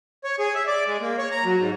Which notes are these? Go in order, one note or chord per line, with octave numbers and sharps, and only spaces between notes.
C#5
G#4
E5
D5
G#3
A#3
C#5
A#5
F#3
G#2